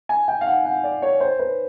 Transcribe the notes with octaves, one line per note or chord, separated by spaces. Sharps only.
G#5
G5
F5
F#5
F#5
D5
C#5
C5
B4